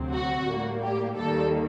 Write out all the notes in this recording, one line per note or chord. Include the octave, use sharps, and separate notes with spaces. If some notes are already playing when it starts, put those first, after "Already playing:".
Already playing: D2 C3 F#3 C4
F#4
A2 G3 A#3
G4
D#2 D#3 G3 A#3 A4